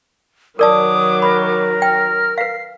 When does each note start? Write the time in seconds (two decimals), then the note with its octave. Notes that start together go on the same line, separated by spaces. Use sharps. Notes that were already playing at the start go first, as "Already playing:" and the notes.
0.59 D#3 F#3 A#4 D5 A5 D6 D#6
1.22 A#4 C5 B5
1.82 G5 F6
2.38 B4 F5 C7